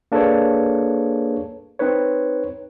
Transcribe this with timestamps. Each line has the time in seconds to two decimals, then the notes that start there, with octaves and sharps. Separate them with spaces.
0.12 A#3 D4 G#4 A4 B4 C#5
1.79 C4 D#4 B4 C#5